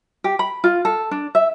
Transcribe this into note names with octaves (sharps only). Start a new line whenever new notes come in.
G4
B5
F4
A4
D4
E5